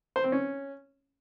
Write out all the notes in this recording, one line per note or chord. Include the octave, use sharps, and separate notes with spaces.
C5
C4
C#4